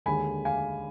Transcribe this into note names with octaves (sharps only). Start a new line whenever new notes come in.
D#2 D3 G#3 G#5 B5
F5 G#5